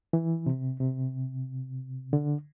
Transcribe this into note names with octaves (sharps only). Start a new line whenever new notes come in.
E3
C3
C3
D3